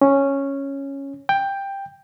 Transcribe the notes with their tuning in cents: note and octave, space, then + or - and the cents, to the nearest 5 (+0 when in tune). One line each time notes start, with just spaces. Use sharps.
C#4 -5
G5 +10